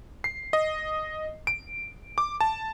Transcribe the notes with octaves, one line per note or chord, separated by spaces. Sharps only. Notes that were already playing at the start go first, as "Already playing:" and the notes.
C7
D#5
D7
D6
A5